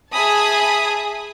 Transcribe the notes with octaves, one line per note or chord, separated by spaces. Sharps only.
G#4 E5 G#5 A5 B5 D#6